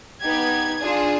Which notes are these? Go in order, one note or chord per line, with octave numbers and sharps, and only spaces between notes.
B3 D#4 G4 G#6
D4 F4 G#4